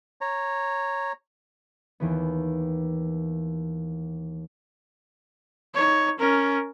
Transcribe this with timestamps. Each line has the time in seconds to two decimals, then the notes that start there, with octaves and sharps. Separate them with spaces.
0.21 C#5 A#5
2.00 D#2 E3 B3
5.75 D#4 C#5
6.19 C#4 A#4